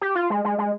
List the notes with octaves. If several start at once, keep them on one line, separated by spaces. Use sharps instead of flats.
G4
F4
G#3
G#3
G#3